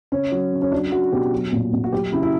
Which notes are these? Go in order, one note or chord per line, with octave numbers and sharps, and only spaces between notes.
C#3 C#4
F#3
C#3
C#4
F#3 D4
F#3 F#4
B2 G4
F#3
A#2
A#2
F#4
F#3 G4
C#3 E4
E4